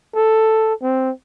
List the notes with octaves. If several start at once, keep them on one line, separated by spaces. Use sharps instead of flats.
A4
C4